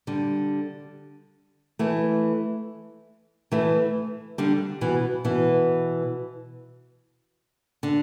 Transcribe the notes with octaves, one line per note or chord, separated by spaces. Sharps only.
D3 G3
E3 A3
E3 A3
D3 G3
B2 E3
B2 E3
D3